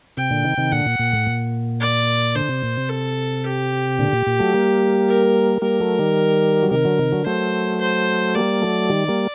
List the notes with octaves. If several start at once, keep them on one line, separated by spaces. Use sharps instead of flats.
C3 G5
A#2 D3
C3 D#3
C3 D#3
A#2 D3 F#5
A#2
A#2
A2
A#2
D5
D3 C5
C3
A#2
C3
A4
G4
A#2 D3
A#2
A#2
F#3 A3
G3 A#3
A#4
G3 A#3 A#4
F#3 A3
D#3 G3
F#3
C3 D#3 A#4
D3 F#3
C3 D#3
D3 F#3
F#3 A3 C5
C5
G3 A#3 D5
F#3 A3
D#3 G3
G3 A#3